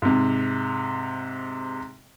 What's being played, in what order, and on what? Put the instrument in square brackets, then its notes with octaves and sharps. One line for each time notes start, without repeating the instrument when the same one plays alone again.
[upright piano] G#2 C3